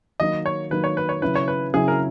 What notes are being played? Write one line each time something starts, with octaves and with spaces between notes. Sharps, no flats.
D#3 F#3 A#3 D#4 D#5
C#5
D#3 F#3 A#3 D#4 B4
C#5
B4
C#5
C#3 F#3 C#4 E4 B4
C#5
B4
C#3 F#3 C#4 E4 G#4
A#4